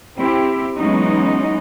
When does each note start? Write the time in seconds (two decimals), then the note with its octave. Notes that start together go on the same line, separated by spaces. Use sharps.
0.18 C4 E4 G4
0.78 E3 F#3 G#3 B3 C#4 D#4